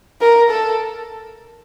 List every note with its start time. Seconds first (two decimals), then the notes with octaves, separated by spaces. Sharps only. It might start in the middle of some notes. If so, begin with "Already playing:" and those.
0.21 A#4
0.50 A4